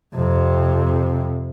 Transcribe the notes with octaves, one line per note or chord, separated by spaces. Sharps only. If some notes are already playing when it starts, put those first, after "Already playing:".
F2 C3